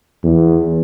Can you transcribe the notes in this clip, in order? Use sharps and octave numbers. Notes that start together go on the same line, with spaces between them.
E2